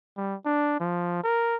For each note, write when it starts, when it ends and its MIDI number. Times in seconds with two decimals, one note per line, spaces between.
0.17 0.35 55
0.46 0.79 62
0.80 1.23 53
1.24 1.56 70